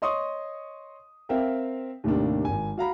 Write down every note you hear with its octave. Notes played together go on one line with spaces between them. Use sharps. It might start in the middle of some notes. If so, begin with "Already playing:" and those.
C#5 D#5 C6 C#6 D#6
C4 A#4 E5 F5 G5
D#2 A2 C3 A#3 D4
G#1 G#5
F#4 F5 A#5 B5